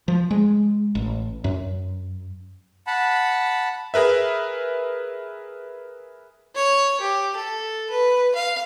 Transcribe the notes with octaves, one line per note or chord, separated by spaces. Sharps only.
F3
G#3
A1
F#2
F#5 A5 B5
G#4 A#4 B4 E5
C#5
G4
A4
B4
F5